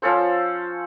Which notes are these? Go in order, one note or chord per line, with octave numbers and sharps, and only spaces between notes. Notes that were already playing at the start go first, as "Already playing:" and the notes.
F3 C#4 A4 C5